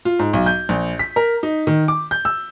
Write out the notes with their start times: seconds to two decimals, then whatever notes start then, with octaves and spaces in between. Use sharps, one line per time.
0.05 F4
0.19 G#2
0.33 B1
0.46 G6
0.69 A#1
0.99 B6
1.16 A#4
1.43 D#4
1.67 D#3
1.88 D6
2.11 G6
2.25 E6